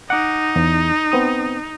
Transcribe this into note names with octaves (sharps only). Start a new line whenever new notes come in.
D#4 F#5 D6
E2
B3 C4 D#6